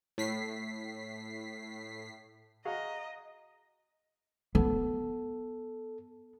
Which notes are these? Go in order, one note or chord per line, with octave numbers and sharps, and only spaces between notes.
A2 B6 C7
F#4 G#4 D#5 F5 A#5
B3 A4